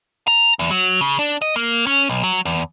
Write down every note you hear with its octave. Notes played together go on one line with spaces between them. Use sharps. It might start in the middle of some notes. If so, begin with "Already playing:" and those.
A#5
E2
F#3
C#3
D4
D#5
A#3
C#4
B1
F#3
E2